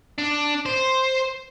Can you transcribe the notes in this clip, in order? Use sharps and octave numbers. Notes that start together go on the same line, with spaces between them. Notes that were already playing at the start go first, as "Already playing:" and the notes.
D4
C5